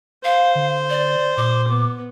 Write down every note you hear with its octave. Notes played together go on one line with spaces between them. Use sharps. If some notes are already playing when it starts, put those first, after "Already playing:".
C5 F5
D3
D5
A#2 D6
B3